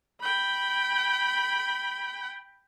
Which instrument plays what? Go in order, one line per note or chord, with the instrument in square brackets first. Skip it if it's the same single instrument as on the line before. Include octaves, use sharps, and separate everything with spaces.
[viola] G5 B5